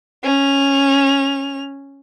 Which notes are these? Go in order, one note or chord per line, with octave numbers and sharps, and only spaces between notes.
C#4 F7